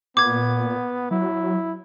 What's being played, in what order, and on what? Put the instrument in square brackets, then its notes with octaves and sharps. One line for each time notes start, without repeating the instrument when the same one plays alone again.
[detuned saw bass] A#2 [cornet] B3 [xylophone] D6 G#6
[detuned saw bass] F#3 [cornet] E4